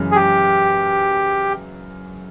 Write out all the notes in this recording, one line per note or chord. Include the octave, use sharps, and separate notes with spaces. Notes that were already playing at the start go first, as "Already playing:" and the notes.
Already playing: F#2 C#3 E3 G#3 C#4
G#4
G4